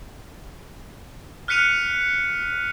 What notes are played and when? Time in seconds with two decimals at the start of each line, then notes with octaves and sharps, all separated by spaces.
1.48 F6 F#6 B6 C#7 D#7 F7